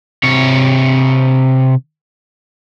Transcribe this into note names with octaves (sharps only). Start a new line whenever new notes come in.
C3 C#5